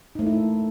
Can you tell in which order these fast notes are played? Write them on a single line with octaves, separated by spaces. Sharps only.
D#4 A3 A#3 E4